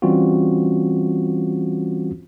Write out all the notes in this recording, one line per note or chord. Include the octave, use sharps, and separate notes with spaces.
E3 G3 C4 C#4 F4 F#4